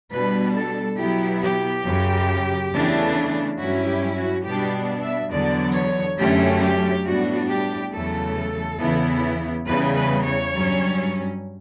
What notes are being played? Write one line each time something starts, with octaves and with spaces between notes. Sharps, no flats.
B2 G3 D4 B4
A4
B2 F#3 B3 E4 G4
G4
F#2 C#3 F#3
E2 C#3 E3 A3 D4
G2 F#3 C#4 E4 F#4
G4
F#4
B2 G3 B3 D4 G4
E5
E2 D3 F#3 B3 D5
C#5
F#2 D3 F#3 A3 C#4 G4
G4
A2 G3 B3 D4 F#4
G4
E2 C#3 F#3 A3 A4
E2 C#3 E3 B3 E4
E2 C#3 G3 B4
B4
C#5
G2 F#3 C#4